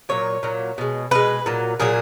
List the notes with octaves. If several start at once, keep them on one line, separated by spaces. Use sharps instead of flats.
A#2 F#3 C#5
A#2 F#3
B2 G#3
B2 G#3 B4
A#2 F#3
A#2 F#3 G#4